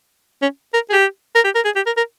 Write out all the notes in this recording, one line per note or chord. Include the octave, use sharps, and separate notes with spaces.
C#4
A#4
G#4
G4
A#4
G4
A#4
G#4
G4
A#4
A#4